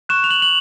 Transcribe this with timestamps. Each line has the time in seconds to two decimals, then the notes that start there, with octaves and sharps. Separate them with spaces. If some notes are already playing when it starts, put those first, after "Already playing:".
0.09 C#6 F#6 E7
0.24 F7
0.30 F#7
0.42 F#7